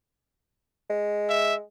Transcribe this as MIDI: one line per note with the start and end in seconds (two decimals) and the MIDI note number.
0.90 1.62 56
1.30 1.55 76